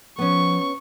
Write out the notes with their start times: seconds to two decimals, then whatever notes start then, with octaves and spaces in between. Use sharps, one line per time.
0.19 F3 B3 C#4 C#6